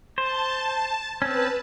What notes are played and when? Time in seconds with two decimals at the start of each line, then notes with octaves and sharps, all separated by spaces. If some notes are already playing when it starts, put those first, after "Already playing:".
0.18 C5 A5
1.22 C4 C#4 B4 A5